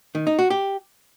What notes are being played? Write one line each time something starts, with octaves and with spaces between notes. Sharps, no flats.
D#3
D#4
F#4
G4